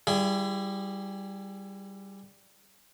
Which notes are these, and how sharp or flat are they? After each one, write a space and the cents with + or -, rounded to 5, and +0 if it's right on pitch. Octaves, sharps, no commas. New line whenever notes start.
G3 -5 E4 +35 G#4 -20